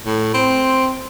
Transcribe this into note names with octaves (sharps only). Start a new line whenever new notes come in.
A2
C4